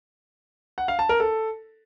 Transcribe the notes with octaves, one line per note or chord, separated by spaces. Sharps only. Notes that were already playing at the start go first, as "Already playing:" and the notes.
F#5
F5
A5
A#4
A4